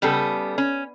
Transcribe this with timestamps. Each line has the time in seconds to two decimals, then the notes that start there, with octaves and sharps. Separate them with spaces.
0.02 C#3 G3 B3 A4
0.58 C#4